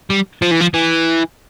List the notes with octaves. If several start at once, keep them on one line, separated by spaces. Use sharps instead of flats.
G3
F3
E3
F3
E3